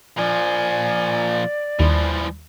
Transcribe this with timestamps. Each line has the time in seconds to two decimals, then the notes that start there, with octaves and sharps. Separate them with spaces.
0.18 A#2 F3 D5 G#5
1.80 D#2 E3 F3 G3